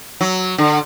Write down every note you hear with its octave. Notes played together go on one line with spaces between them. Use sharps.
F#3
D3